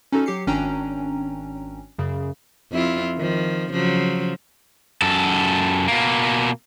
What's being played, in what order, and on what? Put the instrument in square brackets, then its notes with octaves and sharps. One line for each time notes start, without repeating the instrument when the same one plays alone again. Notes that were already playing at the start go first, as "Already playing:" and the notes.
[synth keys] C#4 D#4 F#4 A4
F#3 G4 C7 C#7
G#1 C#4 D4 G5 A#5
F#2 C#3
[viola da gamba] F2 E4 F4
D#3 F3
C#3 F3 F#3
[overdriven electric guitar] F#2 A4
B2 A#3